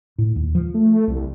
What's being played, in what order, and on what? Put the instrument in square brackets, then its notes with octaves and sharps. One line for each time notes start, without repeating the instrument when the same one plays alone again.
[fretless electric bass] A2
D#2
F3
[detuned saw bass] A3
C2